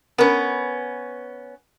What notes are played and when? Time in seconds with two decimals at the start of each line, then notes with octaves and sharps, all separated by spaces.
0.18 B3 C#4 A#4 B4 B5